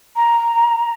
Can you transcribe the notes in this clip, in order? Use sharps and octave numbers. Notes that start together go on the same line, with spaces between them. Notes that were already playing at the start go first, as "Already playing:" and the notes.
A#5